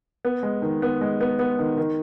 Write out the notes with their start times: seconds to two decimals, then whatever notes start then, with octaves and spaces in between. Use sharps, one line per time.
0.25 B3
0.43 G#3
0.62 D#3
0.82 B3
1.01 G#3
1.21 B3
1.39 B3
1.59 D#3
1.77 D#3